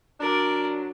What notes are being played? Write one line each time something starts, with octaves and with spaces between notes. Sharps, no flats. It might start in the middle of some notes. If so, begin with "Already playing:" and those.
F#3 D4 A#4 D5